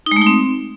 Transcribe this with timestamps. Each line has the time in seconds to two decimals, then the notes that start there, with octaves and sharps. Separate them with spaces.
0.06 D#4
0.11 G#3
0.16 A3
0.22 D#4
0.27 C4